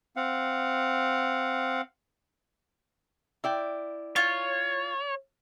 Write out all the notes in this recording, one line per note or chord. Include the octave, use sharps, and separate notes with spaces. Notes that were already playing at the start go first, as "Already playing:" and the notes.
C4 F5 F#5
E4 D5 G5
F4 C#5